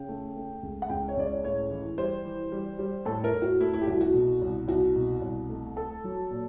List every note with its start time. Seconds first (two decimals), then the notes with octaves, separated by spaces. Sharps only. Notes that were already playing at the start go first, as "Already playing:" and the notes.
Already playing: C#3 G5
0.09 A3
0.36 A3
0.63 C#2
0.82 F#5
0.89 C#2 G5
1.08 C#5
1.16 C#2 D5
1.26 C#5
1.44 A2 C#5
1.71 E3
1.98 G3 C5
2.25 E3
2.52 G3
2.79 G3
3.06 A2 A4
3.24 A#4
3.33 A2
3.42 F#4
3.61 A3 E4
3.74 E4
3.81 G4
3.87 C2 F#4
4.01 F#4
4.14 B2
4.42 C2
4.68 C2 F#4
4.96 B2
5.22 C2
5.49 A3
5.76 A3 A4
6.04 F#3
6.30 A#2